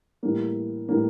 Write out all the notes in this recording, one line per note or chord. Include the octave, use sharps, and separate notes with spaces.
A2 E3 G3 A#3
A2 E3 G3 A#3